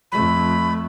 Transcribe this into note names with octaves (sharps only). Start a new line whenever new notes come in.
F2 A3 B5